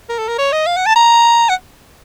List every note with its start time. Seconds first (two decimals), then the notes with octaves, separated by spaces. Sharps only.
0.09 A#4
0.19 A4
0.28 A#4
0.38 C#5
0.52 D#5
0.67 F5
0.77 F#5
0.86 A5
0.96 A#5
1.49 F#5